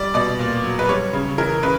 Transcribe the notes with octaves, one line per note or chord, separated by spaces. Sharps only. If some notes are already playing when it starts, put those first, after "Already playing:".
Already playing: G3 D5
B2 D5
A#2
F#3
B4
G3 C#5
C#3
E3 A#4
C#3 B4